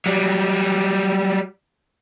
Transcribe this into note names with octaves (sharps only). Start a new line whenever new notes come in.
F#3 G3